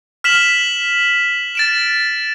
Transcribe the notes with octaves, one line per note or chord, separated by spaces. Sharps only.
F6 B6 E7 F#7
A6 D7 E7